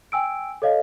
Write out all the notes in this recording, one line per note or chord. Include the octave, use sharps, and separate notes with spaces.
G5 G#5 E6 D7
A4 C#5 D#5 F5